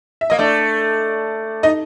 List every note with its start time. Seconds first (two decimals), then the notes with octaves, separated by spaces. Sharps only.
0.21 E5
0.30 A#3 D#5
0.39 A3 D4 D5
1.63 D#4 D#5